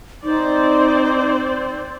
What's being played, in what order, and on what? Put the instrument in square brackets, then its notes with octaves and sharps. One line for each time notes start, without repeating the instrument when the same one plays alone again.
[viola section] C4 C5 D5 [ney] D#4